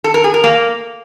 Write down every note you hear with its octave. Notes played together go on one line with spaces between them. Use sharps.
A4
A#4
G#4
A#4
A#3